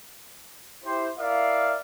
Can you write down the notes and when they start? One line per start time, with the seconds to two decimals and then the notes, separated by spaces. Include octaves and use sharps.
0.85 E4 G4 C5
1.18 E4 A#4 D5 E5 F5